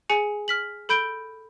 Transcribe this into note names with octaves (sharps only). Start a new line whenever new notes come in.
G#4 G#5 C#7
F6 B6 F#7
A4 B5 G6 D7 G7